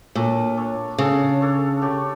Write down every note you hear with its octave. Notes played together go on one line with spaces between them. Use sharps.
A#2 D4 A4 C#5
D4 A4 C#5
C#3 D4 A4 C#5
D4 A4 C#5
A3 D4 G4 C#5